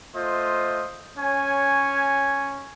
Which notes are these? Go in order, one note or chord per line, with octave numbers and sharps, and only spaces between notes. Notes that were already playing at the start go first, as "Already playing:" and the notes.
A3 F4 C5 D#5
C#4 C#5 G#5